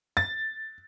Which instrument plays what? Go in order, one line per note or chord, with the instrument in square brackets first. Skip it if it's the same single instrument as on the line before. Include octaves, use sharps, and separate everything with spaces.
[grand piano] A6